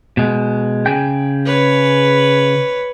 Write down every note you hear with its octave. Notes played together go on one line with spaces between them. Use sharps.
B2 G#3
C#3 G#4 G5
B4 C#5